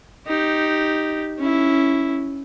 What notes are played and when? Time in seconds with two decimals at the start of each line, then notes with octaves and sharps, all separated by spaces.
0.27 D#4 G4
1.39 C#4 E4